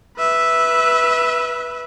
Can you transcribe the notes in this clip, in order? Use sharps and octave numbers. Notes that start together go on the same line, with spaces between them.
B4 E5